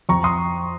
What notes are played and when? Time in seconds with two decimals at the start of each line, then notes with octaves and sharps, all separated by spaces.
0.09 F2 A#5 C#6
0.24 C6 D#6